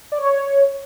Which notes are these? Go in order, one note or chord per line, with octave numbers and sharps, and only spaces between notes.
D5
C#5